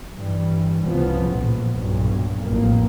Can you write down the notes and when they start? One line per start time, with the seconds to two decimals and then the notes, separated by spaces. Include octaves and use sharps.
0.15 G2 E3 G3
0.81 C2 C#3 F3 B3
1.28 A#1 F2 A2
1.75 B1 G2 A#2 F#3
2.41 A1 F2 A#3